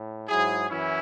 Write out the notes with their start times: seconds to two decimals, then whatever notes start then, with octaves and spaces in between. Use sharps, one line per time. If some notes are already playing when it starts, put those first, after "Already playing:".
Already playing: A2
0.27 G#2 F#3 E4 G#4
0.70 F#2 E3 C#4 E4